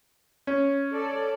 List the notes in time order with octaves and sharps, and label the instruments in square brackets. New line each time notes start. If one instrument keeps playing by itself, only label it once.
[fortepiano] C#4
[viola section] A4 D5